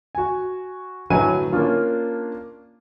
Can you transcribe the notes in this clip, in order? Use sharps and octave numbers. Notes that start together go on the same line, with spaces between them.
F#4 G#5
A2 D3 F#3 B4 G#5 D#7
A#3 C#4 D4 F4